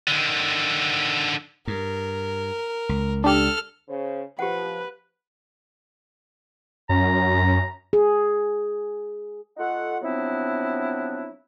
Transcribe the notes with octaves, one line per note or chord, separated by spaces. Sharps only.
D3 D#3
G2 A#4
C#2
D4 G4 A4 F6
C#3 C5
F3 G4 B4 F#5
F#2 A#5
G#4
A3 D#4 F4 A4 F#5
F3 F#3 B3 C4 D4 E4